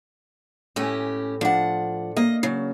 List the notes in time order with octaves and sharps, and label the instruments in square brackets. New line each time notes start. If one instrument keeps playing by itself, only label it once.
[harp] A2 G#5 [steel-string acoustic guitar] C#4 G4
[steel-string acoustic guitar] F3 F#5 [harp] D4
[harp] A#3 [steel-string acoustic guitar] D#5
[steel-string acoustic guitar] C#3 F#3